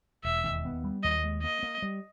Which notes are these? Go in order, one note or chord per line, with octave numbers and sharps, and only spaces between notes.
E1 E5
D#2
B3
G3
D#2 D#5
G#3
A#3 D#5
A#3
G3